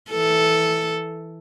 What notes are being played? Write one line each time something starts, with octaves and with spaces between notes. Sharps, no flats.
E3 A4